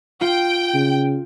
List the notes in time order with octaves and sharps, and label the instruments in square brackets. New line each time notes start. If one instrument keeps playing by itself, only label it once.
[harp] F4 [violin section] G5
[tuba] C#3